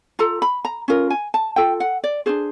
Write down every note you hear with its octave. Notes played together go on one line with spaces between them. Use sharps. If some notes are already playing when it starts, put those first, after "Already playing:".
F4 A4 A#5
B5
A#5
C#4 F4 A#4
G#5
A5
F4 A4 G5
F#5
D5
D4 F4 G#4 C5